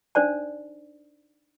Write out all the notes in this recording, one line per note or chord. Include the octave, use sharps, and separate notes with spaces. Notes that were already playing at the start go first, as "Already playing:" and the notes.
D4 D#4 C5 D5 A5